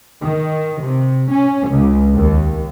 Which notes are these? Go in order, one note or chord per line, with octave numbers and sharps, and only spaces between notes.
D#3
C3
C#4
C#2
D#2